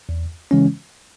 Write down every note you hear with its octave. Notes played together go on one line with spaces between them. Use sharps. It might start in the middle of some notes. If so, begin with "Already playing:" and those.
E2
C#3 E3 G#3 C#4